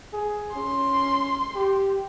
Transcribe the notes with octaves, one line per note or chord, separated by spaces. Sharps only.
G#4
C#4 C6
G4